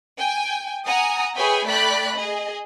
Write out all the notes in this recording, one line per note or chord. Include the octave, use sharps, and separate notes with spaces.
G5 G#5
F#5 G#5 A#5 D#6
G#4 B4 C#5 E5 G5 G#5
A3 D5 G5 B5 F#6 B6
G#4 D#5